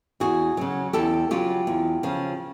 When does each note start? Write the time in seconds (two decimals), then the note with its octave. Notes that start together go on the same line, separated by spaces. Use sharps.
0.20 E2 F#4 G#4
0.57 C#3 F#3
0.93 E2 G4 A4
1.31 C#3 F#3 F4 G4
1.67 E2
2.03 C#3 F3